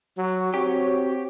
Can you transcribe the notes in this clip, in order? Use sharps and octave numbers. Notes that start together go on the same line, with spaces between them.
F#3 F#4
C4 G4 C#5